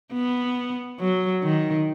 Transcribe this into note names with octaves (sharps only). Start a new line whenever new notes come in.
B3
F#3
D#3